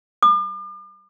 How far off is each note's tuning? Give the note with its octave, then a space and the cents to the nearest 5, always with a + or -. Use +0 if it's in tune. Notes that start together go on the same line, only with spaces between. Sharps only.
D6 +40